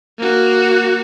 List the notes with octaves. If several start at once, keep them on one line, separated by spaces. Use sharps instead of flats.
A#3 F#4